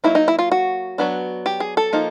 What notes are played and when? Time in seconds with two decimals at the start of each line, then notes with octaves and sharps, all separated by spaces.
0.04 F#3 A#3 D#4 E4
0.15 D#4
0.28 E4
0.39 F4
0.52 F#4
0.98 F#3 B3 D4
1.46 G4
1.60 G#4
1.77 A4
1.93 F3 A#3 D#4